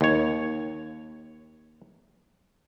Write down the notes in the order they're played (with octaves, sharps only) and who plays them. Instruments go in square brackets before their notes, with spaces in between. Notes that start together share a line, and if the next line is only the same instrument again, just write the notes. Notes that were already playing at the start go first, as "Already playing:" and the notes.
[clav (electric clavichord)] D#2 C#5